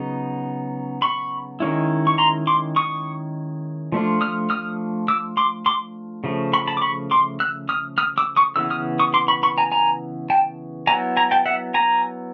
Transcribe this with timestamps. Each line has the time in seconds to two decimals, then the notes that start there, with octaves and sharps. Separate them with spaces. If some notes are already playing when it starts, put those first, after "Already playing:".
Already playing: C#3 F#3 B3 D#4
1.02 B5 C#6
1.60 D#3 G#3 C#4 E4
2.07 C#6
2.18 A#5 C6
2.47 C6 D6
2.76 C#6 D#6
3.92 F3 A3 D4 F4
4.21 D#6 F6
4.50 D#6 F6
5.08 D6 E6
5.37 C6 D6
5.66 C6 D6
6.24 C#3 F3 A3
6.53 B5 C#6
6.67 A5 B5
6.77 D6
6.82 B5 C#6
7.11 C6 D6
7.40 E6 F#6
7.69 D#6 F6
7.98 D#6 F6
8.18 D6 E6
8.37 C#6 D#6
8.56 C#3 E3 B3 E6
8.70 D#6 F6
8.99 C#6 D#6
9.14 C6 D6
9.28 B5 C#6
9.43 B5 C#6
9.58 G#5 A#5
9.72 G#5 A#5
10.30 G5 A5
10.87 F#3 B3 E4 G#5 A#5
11.17 G#5 A#5
11.31 G5 A5
11.46 E5 F#5
11.74 G#5 A#5